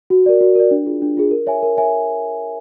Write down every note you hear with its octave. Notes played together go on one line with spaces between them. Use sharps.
F#4
A#4 D5
F#4
A#4 D5
D4
F4 G#4
D4
F4 G#4
A#4
C#5 E5 G#5
A#4
C#5 E5 G#5